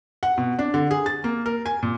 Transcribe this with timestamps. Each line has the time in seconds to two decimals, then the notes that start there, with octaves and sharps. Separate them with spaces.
0.23 F#5
0.38 B2
0.59 D4
0.74 D3
0.91 G#4
1.06 A6
1.24 A#3
1.46 A#4
1.66 G#5
1.83 A#2